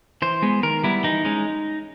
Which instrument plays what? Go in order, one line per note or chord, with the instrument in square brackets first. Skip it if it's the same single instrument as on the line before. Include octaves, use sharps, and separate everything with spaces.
[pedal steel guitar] E3 C5
G#3 B3
D#3 A#4
G3 B3 E4
E3 D#4
G#3 C#4